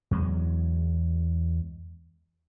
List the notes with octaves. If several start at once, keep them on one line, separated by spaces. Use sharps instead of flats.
E2 F#3 G#3